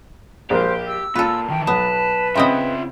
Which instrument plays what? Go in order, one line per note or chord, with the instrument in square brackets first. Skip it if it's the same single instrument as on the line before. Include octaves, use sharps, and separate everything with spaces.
[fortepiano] A#1 A#4 [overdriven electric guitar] G4 [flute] C5
[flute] E6
[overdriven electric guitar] A#2 [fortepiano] F4 [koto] A4 B4
[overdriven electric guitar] D#3 E3 [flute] G5
[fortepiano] B1 [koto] B3 [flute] B4 [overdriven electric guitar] A5
[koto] C#3 B3 C4 [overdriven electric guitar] F4 E5 [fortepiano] D#5 G5 C6